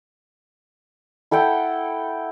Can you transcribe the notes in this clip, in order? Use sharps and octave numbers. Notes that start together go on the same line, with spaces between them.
E4 A4 F#5 G5